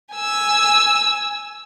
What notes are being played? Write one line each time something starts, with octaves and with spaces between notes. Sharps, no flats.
G#5 E6